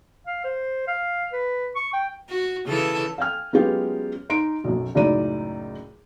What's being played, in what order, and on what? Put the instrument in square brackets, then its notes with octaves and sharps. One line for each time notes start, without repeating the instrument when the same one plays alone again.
[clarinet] F5
C5
F5
B4
C#6
G5
[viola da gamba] F#4
C#3 E3 A4
[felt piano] F5 G5 G#5 F6
F#3 G#3 B3 C#4 F4 G4
D#4 C6 D7
B1 F#2
C#2 F#2 A2 D#4 D5 D#7